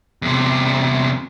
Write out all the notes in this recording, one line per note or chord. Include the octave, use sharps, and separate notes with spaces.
E2 C3